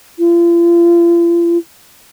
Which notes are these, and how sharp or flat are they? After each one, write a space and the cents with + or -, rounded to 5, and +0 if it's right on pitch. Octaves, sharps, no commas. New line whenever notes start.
F4 -40